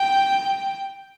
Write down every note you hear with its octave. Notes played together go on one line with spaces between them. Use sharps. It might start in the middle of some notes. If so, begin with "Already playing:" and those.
Already playing: G5